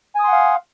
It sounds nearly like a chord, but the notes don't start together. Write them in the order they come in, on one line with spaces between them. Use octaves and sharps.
G#5 D#6 C6 F#5 F5